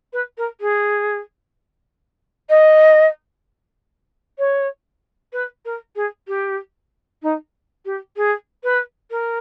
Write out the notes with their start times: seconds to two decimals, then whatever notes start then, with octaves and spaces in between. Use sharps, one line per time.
0.13 B4
0.38 A#4
0.61 G#4
2.49 D#5
4.38 C#5
5.33 B4
5.65 A#4
5.96 G#4
6.28 G4
7.22 D#4
7.85 G4
8.16 G#4
8.64 B4
9.11 A#4